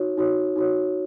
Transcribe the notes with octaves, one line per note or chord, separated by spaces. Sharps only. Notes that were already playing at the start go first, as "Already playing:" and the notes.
Already playing: D#4 F#4 C#5
D#4 F#4 C#5
D#4 F#4 C#5